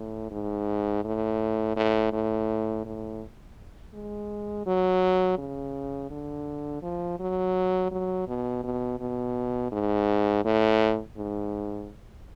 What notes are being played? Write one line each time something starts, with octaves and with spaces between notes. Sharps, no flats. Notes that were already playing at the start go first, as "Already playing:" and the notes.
Already playing: A2
G#2
A2
A2
A2
A2
G#3
F#3
C#3
D3
F3
F#3
F#3
B2
B2
B2
G#2
A2
G#2